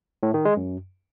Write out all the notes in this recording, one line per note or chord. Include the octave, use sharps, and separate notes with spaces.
A2
D#3
G#3
F#2